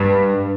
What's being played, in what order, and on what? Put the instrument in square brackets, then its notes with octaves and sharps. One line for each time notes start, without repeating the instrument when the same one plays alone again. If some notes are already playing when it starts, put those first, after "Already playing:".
Already playing: [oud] G2